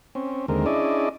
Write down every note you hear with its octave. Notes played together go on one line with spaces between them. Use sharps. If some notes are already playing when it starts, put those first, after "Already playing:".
C4 C#4
D#2 D3 G#3 C4 A#4
C#4 D4 E4 G#4 D5 D#5